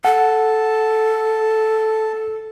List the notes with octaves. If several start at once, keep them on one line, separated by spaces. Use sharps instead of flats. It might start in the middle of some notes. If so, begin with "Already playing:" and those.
A4 F#5 A5